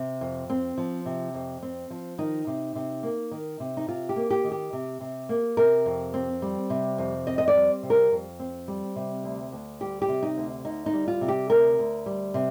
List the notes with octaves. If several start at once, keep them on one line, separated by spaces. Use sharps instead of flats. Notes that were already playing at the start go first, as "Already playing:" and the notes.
Already playing: C3
F2
C4
F3
C3
F2
C4
F3
D#3 D#4
C3
C3
A#3
D#3
C3
D#4
C3 F4
G4
A#3
G4
D#3
G4
C3
C3
A#3
C3 A#4
F2
C4
G3
C3
F2
C4 D#5
D#5
D5
G3
C3
A#4
F2
C4
G3
C3
D2
D2
G3 G4
G4
C3
D#4
D2
D2 D#4
D#4
G3
F4
C3
G4
D2 A#4
D2
G3
C3